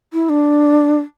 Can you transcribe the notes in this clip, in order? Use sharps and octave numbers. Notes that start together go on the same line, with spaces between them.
E4
D4